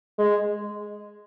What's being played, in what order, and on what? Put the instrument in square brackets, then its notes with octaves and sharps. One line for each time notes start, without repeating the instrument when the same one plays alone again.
[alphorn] G#3